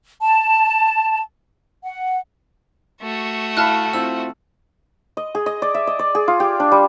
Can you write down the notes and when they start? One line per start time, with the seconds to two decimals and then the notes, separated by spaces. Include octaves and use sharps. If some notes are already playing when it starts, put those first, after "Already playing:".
0.22 A5
1.83 F#5
3.02 A3 F#4
3.57 E4 F5 A5 B5 F6 F#6
3.93 C4 E4 F4 E6
5.17 D#5
5.35 G#4
5.46 D#5
5.62 D5
5.74 E5
5.87 D#5
5.99 D5
6.15 G#4
6.28 F4
6.40 G4
6.60 D4
6.72 G3